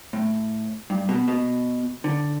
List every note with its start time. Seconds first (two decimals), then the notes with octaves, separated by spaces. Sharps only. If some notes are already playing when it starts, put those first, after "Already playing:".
0.13 A2
0.90 G2
1.09 B2
1.28 B2
2.04 D3